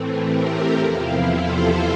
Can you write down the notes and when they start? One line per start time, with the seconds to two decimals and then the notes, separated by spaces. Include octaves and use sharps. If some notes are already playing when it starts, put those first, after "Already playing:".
Already playing: A2 E3 A3 C4
0.21 G4 A#4
0.75 E2 C3 F3 C4 E4 F4
1.30 A4 C5